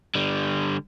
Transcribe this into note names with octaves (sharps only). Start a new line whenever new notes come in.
D3 G3